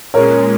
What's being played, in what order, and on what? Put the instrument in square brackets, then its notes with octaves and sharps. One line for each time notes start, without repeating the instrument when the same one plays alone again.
[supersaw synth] A#2 G#3 C#4 [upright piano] A#4 C#5